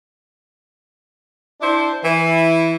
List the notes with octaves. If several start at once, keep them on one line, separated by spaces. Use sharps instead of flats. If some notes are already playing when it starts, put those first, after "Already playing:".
D4 E4 C5
E3 E4